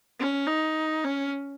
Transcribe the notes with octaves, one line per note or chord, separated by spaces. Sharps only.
C#4
D#4
C#4